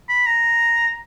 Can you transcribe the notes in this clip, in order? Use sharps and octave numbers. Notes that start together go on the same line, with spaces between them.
B5
A#5